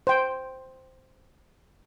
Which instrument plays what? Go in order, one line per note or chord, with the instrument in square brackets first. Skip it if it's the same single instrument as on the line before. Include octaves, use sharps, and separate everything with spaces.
[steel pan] C5 G5